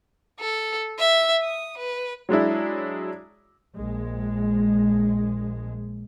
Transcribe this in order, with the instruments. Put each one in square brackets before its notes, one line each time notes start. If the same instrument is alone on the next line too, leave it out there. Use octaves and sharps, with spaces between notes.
[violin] A4
E5
D#6
B4
[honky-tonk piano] F#3 G#3 D4 E4
[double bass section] A#1 G#3